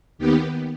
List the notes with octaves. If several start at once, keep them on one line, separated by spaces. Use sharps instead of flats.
D#2 D#3 B3 G4